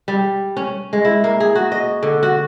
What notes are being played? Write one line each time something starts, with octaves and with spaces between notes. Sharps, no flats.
G3
C#4
G#3
E4
A#3
G#4
F#4
D#5
D3
F#4